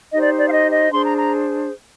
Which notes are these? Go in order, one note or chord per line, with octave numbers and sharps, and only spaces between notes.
D#4 G4 C5 D#5
D5
D5
F5
D#5
D#5
D4 G#4 C5 C6
A#5
A#5